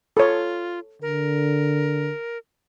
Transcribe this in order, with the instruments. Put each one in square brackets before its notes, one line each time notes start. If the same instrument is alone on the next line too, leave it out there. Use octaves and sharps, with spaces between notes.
[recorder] F4 [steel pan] A4 C#5
[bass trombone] D3 [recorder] A#4